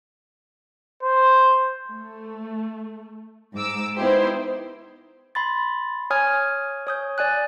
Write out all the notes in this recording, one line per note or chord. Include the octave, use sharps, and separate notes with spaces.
C5
A3
G#2 D6 E6
B3 D#4 E4 G4 C5
B5 C6 A6
C#5 G#5 D#6 F6 G#6
C#5 D#6 G6
D5 G#5 F#6